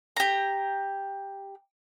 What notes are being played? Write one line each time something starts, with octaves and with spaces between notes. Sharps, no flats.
G4 A#5